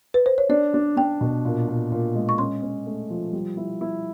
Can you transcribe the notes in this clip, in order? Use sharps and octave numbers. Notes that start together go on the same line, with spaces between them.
B4
C5
C#5
D4 D5
D4
D4 G5
B2
A#2
A#2
A#2
G#3
C#6
C#4 C6
C#4
A3
F3
G3
E4
E4